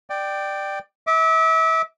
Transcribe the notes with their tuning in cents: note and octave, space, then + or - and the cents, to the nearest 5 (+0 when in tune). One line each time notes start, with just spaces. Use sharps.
D5 +15 G5 -5
E5 -35 D6 +0